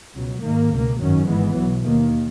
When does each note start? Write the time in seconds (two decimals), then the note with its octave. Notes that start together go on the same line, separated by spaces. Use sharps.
0.16 C#2 B2 F#3
0.43 G#2 D#3 A#3
0.72 C#2 B2 A#3
1.00 G#1 F#2 D#3 F#3 C#4
1.28 G#1 G#2 E3 G#3 B3
1.56 B1 B2 F#3
1.84 D#2 D#3 A#3